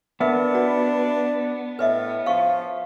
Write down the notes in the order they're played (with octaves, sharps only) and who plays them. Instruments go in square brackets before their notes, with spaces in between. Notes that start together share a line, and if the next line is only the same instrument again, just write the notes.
[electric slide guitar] B3 [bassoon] D4 [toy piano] A#4 B4 E5
[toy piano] F#4 D5
[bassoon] A2 [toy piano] B4 D#5 E5
[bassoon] F3 [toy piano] F5 C#6